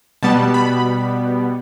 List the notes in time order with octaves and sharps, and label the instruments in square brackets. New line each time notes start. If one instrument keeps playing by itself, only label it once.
[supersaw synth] B2 G3 B3 A5
B5